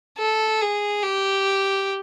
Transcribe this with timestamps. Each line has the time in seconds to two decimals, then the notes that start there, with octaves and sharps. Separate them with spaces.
0.18 A4
0.61 G#4
1.03 G4